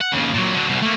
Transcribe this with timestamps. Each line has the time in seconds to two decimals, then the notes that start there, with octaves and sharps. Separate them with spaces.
0.01 F#5
0.12 D#2 C#3
0.34 A#2 F#3
0.54 D3 F#3
0.69 C2 B2
0.82 A3 A#3